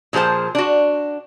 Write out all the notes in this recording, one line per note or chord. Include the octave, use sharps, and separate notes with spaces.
A#2 F3 G#4 C5 A5
D4 F#4